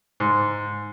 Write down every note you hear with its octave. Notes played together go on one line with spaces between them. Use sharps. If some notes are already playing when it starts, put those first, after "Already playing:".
G#2